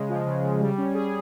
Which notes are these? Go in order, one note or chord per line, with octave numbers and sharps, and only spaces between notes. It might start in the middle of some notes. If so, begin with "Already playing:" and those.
Already playing: C#3 G#3
F3
C#3
C#3
G3
C#4
G#4